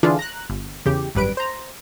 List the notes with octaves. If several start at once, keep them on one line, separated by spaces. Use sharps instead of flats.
D3 E3 D4 F4 G#4
A#5 F#6
G1
E2 C#3 G4
G#1 F#2 G3 B4 D7
C5 A#5